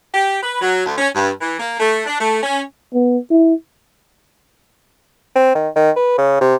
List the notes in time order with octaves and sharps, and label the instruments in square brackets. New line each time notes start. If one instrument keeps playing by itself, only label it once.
[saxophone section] G4
B4
F#3
D2
C#4
G2
E3
A#3
A3
D4
A3
C#4
[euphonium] B3
E4
[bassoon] C4
D#3
D#3
B4
C#3
C3